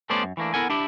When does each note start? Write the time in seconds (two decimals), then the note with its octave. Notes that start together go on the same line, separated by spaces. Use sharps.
0.10 G3 A3 B3 C#4 C5 D5
0.23 F#2
0.37 E3 A3 A#3 D4
0.54 B3 E4 A4 A#4 F#5 G#5
0.70 D4 E4 G4